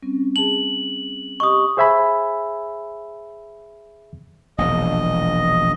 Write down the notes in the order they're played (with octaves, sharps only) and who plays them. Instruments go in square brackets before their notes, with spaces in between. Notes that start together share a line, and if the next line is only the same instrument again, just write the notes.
[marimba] G3 C4 C#4
[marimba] G#4 A5 [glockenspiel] F#7
[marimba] G4 D#5 [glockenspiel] C#6 D#6
[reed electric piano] G#4 C5 E5 G#5 B5
[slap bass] E1 A#1 [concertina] D#5